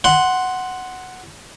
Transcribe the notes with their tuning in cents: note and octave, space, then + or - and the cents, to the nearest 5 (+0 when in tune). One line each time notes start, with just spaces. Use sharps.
F#5 +0 C6 +0